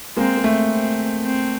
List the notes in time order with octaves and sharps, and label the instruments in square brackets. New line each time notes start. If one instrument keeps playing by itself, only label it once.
[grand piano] G#3 A#3 [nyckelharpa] C4
[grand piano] A#3
A3
[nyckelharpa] C4
C4